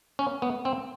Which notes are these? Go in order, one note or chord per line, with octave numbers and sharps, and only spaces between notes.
C#4
B3
C4